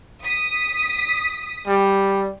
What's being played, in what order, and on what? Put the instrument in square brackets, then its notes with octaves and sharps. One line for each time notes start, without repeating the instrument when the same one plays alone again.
[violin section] D#6 B6
[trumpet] G3